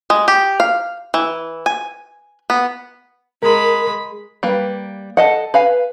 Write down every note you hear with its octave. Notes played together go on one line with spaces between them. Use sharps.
G#3
G4
F5
E3
G#5
B3
G#3 A#4 B5
G3 A#3 B4
A4 D#5 F#5
B4 F5 G#5